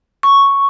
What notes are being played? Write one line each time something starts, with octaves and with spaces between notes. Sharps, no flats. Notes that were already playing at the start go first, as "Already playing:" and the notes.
C#6